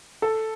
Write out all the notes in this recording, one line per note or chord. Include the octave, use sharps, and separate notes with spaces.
A4